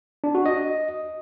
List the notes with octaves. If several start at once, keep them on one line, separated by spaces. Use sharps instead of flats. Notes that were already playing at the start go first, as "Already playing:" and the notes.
D4
F#4
D#5